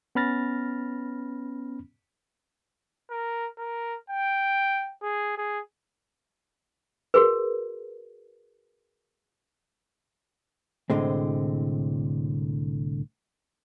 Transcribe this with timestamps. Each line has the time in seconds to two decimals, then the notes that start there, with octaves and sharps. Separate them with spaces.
0.15 B3 C#4 B5 F6 A6 A#6
3.11 A#4
3.58 A#4
4.10 G5
5.02 G#4
5.38 G#4
7.14 F#4 G#4 A#4 B4
10.90 C2 A2 D3 G#3 C4